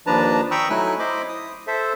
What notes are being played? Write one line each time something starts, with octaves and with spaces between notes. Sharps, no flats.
D#2 F3 D4 B4 A5 A#5
G5 A#5 B5 C#6 D#6 E6
F#3 A3 D#4 E4 G#5 F#6
E4 C5 D#5 B5 D6
D#6
A4 C5 E5